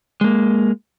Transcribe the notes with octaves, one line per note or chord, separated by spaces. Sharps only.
G#3 A#3